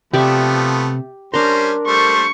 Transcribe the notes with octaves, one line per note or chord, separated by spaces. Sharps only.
C3 F3 A3 B3 G4 D5 E5
G3 C#4 D4 A#4 C5 C6
G3 A3 C5 C#6